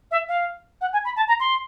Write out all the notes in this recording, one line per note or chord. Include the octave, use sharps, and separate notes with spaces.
E5
F5
F#5
G#5
B5
A5
A#5
C6